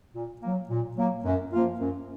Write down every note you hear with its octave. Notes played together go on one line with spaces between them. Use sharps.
A#2
F#3 A#3
A#2
F#3 A#3
F#2
F3 A#3 F4
F#2